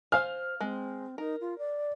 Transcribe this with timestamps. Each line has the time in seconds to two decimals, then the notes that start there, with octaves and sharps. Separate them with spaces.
0.12 C5 F5 G#5 F6
0.61 G#3 C4
1.18 D#4 A#4
1.41 F4
1.58 D5